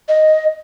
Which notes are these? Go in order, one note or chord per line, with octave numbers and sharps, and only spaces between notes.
D#5